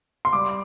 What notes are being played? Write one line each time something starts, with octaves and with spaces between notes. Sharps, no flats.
C6
G3 D6